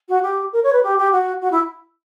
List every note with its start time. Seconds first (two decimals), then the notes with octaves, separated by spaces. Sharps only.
0.09 F#4
0.23 G4
0.53 A#4
0.63 C#5
0.73 B4
0.83 G4
0.98 G4
1.12 F#4
1.41 F#4
1.52 E4